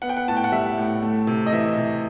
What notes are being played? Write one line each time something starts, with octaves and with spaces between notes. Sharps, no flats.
B3 F#5
G5
F#5
A2 A5
G5
F#5
G3 E5
A2
A3
C3
D#5
E3 E5
C3